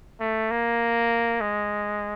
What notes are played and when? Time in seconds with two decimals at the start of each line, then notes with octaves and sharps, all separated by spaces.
0.20 A3
0.51 A#3
1.41 G#3